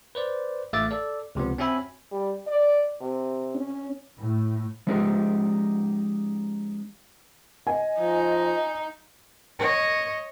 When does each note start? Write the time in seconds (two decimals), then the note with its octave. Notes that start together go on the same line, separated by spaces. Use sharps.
0.15 B4 C5 D5
0.73 A1 A3 E5 F5 D6 A6
0.91 A4 D5
1.35 C#2 C3 F3 B3
1.58 C4 C#4 F#4 E5 G#5 B5
2.12 G3
2.47 D5
3.01 C3
3.55 C#4
4.20 A2
4.87 F3 G#3 C#4 D#4 G4
7.67 D#5 G#5
8.00 F3 D#4
9.59 C#5 D#5